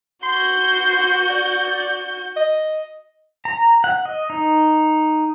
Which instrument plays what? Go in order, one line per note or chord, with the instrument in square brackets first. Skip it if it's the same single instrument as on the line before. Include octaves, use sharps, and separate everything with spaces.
[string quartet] F#4 G6 [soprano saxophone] C6
[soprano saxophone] D5
D#5
[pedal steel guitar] A#5
F#5
D#5
D#4